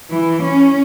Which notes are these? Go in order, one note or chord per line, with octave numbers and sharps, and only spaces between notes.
E3
C#4